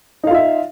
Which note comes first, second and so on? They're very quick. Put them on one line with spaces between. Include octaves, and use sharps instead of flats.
D#4 F5 F4 E5